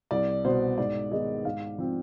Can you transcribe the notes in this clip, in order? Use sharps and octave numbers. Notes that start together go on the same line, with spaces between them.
C2 D5
B2 B3 C5
G#2 D5
D#3 G#3 B3 D#5
G#2 F5
F3 C4